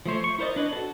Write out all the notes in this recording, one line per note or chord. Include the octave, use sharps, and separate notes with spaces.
F3 A3 C5 C#5
C#6
E4 A#4 C5 D5 D#5
D4 B4 C#5 D#5
F#4 A4